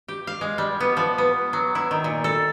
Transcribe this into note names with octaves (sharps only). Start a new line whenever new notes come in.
G4
F5
G#3
G3
B3
F3
B3
F#3
E4
D#3
A#2
A4